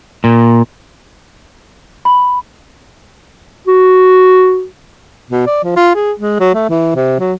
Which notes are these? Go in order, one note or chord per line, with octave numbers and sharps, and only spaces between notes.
A#2
B5
F#4
B2
D5
F3
F4
G#4
G#3
F#3
A3
E3
C3
F#3